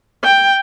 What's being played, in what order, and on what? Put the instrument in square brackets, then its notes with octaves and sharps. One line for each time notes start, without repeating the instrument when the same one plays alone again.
[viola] G5